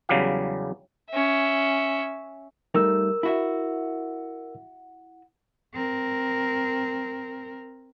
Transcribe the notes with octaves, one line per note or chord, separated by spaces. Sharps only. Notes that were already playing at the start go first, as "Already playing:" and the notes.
E2 C#3 F#3 G3 G4 F5
C#4 E5
G3 A3 D#4 A#4 E6
E4 F#4 E5
C4 A#4